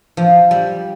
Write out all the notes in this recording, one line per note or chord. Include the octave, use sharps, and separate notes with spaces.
F3
G3